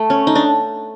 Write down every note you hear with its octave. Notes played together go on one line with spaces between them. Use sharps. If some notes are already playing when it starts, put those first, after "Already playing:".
Already playing: A3
C#4
D#4
D4